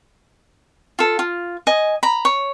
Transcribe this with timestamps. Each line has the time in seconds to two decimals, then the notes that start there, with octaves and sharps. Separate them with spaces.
0.99 F4 A4
1.19 F4
1.67 D#5 G#5
2.03 A#5 B5
2.25 C#5